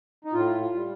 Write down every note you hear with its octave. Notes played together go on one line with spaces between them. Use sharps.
D#4
A2 F4
F4
G3